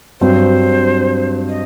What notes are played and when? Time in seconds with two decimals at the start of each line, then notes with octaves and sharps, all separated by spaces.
0.20 G2 F#3 C4 C5
1.49 D#5